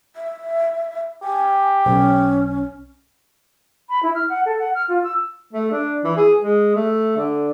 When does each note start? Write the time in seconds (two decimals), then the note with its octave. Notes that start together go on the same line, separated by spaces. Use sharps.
0.16 E5
1.23 G4 G#5
1.86 B1 C#4
3.89 B5
4.03 E4
4.15 F6
4.29 F#5
4.46 A4
4.59 F#5
4.75 F6
4.89 F4
5.03 E6
5.53 A3
5.71 D4
6.04 E3
6.16 G#4
6.40 G#3
6.75 A3
7.17 D3